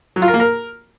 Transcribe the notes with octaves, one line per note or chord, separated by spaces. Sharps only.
F#3
F4
A#4
A#3
A#4